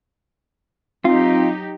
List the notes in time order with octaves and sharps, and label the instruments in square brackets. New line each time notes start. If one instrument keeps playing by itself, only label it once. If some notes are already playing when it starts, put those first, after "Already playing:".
[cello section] F#3 D#4 G4 [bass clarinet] C4 [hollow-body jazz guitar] F4